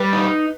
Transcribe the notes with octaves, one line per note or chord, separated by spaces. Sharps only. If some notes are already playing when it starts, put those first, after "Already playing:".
Already playing: G3 B4
D#4